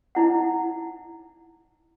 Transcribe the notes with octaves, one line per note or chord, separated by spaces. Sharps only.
D#4 E4 F#5